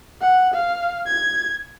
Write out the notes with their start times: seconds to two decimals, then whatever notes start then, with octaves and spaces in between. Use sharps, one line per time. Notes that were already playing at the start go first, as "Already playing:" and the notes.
0.21 F#5
0.54 F5
1.07 G#6